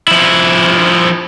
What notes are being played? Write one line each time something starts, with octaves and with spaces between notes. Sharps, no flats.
F3 E4